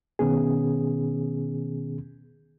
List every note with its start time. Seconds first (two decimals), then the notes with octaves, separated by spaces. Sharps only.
0.19 B2 D#3 B3 C#4 G#4